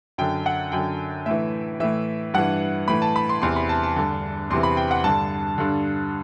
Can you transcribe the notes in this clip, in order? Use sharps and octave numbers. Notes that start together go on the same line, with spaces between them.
F#2 D3 G5
F#5
F#2 D3 G5
A2 E3 E5
A2 E3 E5
G2 E3 F#5
A2 E3 B5
A5
B5
C6
E2 C3 E3 C6
B5
A5
A5
G2 D3
E2 C3 E3 C6
B5
G5
F#5
G2 D3 A5
G2 D3